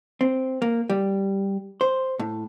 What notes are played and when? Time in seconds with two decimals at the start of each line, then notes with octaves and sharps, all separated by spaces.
0.21 C4
0.62 A#3
0.90 G3
1.81 C5
2.19 A2